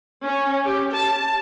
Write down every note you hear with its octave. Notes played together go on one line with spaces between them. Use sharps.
C#4
G4
A5